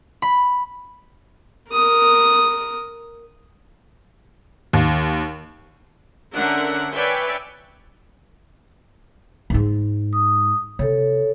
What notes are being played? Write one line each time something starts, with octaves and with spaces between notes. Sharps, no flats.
B5
A#4 D#6
D#2
D3 C#4 D4 A#4 E5 F#5
B4 C#5 D5 E5 G5 G#5
G#2 G#3
D#6
C3 A4 C#5